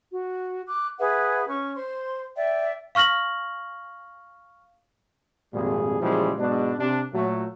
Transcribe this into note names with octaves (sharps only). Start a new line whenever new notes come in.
F#4
D6 F#6
G#4 B4 E5 F#5
C#4 C#6
C5 C6
D5 E5 G5
F5 C#6 F6 A#6 F#7
G#1 F2 A#2 G3 G#4
A#2 C#3 E3 F3 G3 G#3
B1 G#2 B2 G#3 D4
C3 D4
A#2 F#3 A3